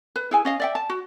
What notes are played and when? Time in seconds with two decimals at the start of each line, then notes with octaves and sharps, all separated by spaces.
0.16 B4
0.31 E4 G#4 G#5
0.45 C#4 D#5 F5
0.60 D5 E5 G5
0.75 A5
0.90 F#4